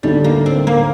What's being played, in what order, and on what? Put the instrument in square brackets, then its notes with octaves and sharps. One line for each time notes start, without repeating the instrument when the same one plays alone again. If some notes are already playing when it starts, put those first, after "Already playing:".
[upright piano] D2 D3 A3 D#4 [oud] G3
[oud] A#3
C4
A#3